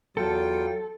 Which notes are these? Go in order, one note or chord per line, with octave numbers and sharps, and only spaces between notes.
E2 F#3 F4 A4 G5